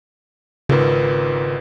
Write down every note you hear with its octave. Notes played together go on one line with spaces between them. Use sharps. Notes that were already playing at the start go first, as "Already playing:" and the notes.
G#1 G#2 C#3 F4 A#4 B4